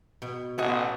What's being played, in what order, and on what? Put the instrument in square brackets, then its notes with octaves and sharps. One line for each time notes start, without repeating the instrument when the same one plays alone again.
[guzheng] B2
[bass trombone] A1 [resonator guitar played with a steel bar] B3 F#4 D#5